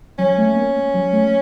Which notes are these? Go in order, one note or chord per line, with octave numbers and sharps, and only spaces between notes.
F#3 C#4
A3
A#3
F#3
A3